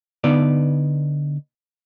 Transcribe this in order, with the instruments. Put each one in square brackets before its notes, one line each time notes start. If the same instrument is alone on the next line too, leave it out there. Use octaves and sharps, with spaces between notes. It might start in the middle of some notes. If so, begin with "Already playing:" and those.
[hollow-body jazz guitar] D3 B3 D#4 B4 D5